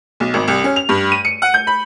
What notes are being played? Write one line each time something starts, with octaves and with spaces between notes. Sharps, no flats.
B1
G#1
C2
C#4
F7
G2
D#7
C#7
F#5
G6
B5